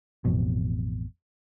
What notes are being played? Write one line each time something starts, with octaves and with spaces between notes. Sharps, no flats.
A1 F2 B2